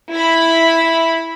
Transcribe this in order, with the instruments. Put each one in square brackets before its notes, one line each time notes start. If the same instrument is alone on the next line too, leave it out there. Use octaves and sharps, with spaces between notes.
[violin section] E4 B5